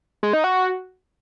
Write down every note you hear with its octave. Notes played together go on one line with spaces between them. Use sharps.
G#3
D#4
F#4